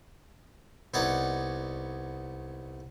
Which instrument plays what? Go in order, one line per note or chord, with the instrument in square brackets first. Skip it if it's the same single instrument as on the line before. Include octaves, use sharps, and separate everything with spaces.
[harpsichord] C2 B3 D#4 C#5 D5 F#5